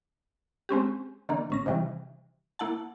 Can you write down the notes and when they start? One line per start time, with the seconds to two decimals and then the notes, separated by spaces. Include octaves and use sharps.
0.69 G#3 C4 C#4 G4
1.29 D3 D#3 A#3
1.50 A1 C#4 A#6
1.66 C3 D#3 E3 G3
2.59 A#3 E4 F#5 A5